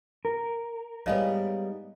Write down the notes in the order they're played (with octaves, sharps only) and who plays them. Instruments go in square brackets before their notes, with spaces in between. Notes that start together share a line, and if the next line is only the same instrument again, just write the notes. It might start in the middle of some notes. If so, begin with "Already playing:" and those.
[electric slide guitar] A#4
[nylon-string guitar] G#2 G3 B3 [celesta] C#5 D#5 F5